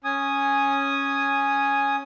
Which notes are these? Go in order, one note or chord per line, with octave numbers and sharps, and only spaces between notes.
C#4 G#5 D#6